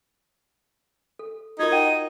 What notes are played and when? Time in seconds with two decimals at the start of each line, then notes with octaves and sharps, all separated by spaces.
1.19 A4
1.59 D#4 F4 F#4 A#4 G#6
1.72 D#5 F#5 G5 D#7